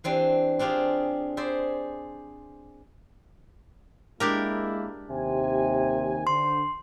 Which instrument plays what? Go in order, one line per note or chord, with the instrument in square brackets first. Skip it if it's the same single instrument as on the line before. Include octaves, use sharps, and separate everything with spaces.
[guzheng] E3 C4 D4 G4
C4 D4 F4 G4 G#4
G#4 C5 D5 E5
[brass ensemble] G#3 A#3 E4 [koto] D4 G4 A#4
[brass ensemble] D#2 G#5 [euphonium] C3
[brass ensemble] D3 C5 [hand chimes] C6